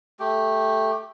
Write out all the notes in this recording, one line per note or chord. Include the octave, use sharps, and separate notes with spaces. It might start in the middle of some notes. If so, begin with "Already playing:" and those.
A3 G4